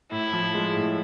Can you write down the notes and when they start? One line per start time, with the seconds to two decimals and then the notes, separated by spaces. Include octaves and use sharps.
0.11 A2 E4
0.33 F3
0.54 G#3
0.76 A2